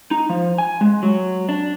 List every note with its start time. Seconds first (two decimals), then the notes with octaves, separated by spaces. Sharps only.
0.11 D#4
0.29 F3
0.58 G#5
0.81 G#3
1.03 F#3
1.49 D4